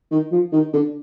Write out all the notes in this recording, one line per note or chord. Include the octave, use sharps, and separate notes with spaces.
D#3
F3
D#3
D3